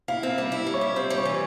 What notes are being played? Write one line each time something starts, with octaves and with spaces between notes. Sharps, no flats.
E4 F5
C4
F5
G3
E4
G3
C#5
E4
C4 C5
G3
C#5
E3